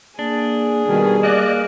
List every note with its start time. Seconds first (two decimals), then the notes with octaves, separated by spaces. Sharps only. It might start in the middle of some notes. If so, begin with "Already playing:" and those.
0.19 A#3 D4 G#4
0.88 B2 D#3 G3
1.23 A#3 D5 D#5 F#6